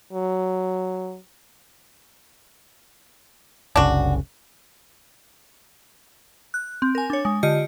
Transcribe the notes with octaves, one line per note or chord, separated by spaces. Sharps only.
F#3
F#1 C2 C#3 D4 F#4
F#6
C4
A#4 G#5
D4 C#5
G#3
D3 F4 G4 D#5 C#7